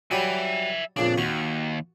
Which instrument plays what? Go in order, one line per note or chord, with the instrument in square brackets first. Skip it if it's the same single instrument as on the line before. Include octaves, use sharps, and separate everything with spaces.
[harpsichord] F#3 G3 G4 [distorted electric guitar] E5 G#5
[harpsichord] F2 A#2 C#3 [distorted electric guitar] D4
[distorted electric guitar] D#2 [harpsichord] F#4